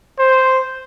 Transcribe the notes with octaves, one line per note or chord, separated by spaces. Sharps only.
C5